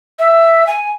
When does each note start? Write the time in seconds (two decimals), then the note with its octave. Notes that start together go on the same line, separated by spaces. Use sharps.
0.19 E5
0.67 G#5